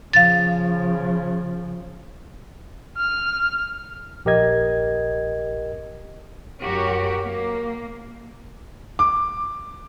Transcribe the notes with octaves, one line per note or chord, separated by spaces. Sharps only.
C#3 F3 F5 A6
F6
A#1 G4 A#4 D#5 G#6
F#2 F#4 G4 A#4 C#5
A#3
D6